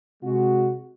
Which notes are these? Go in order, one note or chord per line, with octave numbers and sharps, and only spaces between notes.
C3 G#3 F#4